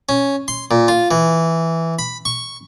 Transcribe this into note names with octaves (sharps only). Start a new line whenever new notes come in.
C#4
C6
A#2
F4
E3
B5
C#6